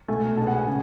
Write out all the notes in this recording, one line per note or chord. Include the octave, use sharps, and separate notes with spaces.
B2 A3 G#5
B2 G#3 B3 A5
F#5
G#5
C#3